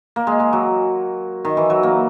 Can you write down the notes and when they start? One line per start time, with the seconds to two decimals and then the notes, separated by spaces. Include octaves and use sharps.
0.16 A#3
0.27 G#3
0.40 G#3
0.53 F#3
1.45 D#3
1.57 E3
1.70 F#3
1.83 A#3